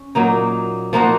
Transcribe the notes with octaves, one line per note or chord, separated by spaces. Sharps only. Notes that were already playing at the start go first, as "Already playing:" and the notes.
Already playing: C#4
A#2 F#3 A#3 D#4
F3 A#3 D#4 F#4